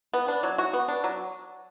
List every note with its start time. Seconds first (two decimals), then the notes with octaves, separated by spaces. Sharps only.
0.14 B3
0.28 D4
0.43 F#3
0.58 F#4
0.73 B3
0.88 D4
1.04 F#3